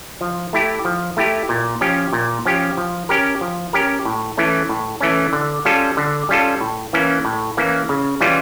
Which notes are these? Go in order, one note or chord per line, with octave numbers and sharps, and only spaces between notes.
F3
A3 E4 G4
F3
A3 E4 G4
A#2
F3 C#4 G4
A#2
F3 C#4 G4
F3
C#4 G4 A#4
F3
C#4 G4 A#4
A2
E3 A3 C#4
A2
E3 A3 C#4
D3
G3 C#4 F4 A4
D3
G3 C#4 F4 A4
A2
E3 A#3 C#4
A2
E3 A#3 C#4
C#3
E3 G3 C#4 F4